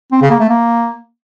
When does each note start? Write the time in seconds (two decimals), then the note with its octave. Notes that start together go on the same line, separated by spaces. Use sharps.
0.12 C4
0.21 C#3
0.31 A#3
0.40 A3
0.49 A#3